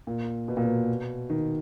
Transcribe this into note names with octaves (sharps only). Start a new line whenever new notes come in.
A#2
B2
A#2
B2
D#3